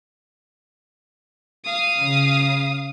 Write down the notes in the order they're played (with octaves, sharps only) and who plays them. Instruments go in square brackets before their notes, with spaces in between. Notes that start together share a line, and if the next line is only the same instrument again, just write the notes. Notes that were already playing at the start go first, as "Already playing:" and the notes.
[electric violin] F5 D#6
[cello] C#3